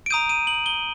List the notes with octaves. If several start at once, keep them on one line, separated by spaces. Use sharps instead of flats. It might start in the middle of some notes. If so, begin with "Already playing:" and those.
D7
A#5 D#6 G6 D#7
D#7
F#7
G7